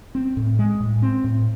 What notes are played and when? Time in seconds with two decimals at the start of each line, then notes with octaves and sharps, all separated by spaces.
0.15 C4
0.37 A2
0.59 G#3
0.80 A2
1.02 C4
1.24 A2